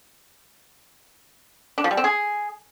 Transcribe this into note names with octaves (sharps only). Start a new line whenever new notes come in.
D4
F3
G3
C4
G#4